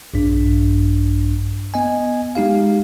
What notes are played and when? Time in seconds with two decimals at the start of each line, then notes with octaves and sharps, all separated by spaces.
0.14 A#1 G2 D4
1.74 B3 D#5 G#5
2.35 G#3 D#4 G4 F5